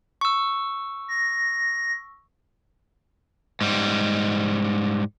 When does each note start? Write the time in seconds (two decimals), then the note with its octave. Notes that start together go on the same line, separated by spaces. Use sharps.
0.21 C#6 E6
1.08 A#6
3.61 G#2 G3